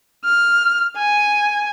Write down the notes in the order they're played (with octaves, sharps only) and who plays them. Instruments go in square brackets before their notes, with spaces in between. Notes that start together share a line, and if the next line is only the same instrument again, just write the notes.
[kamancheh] F6
G#5